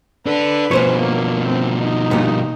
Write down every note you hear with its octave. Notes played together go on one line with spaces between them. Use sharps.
D4 A4 B4
B2 F3 C#4 C5 C#5
A#3
C4
D#4
G2 A#2 G4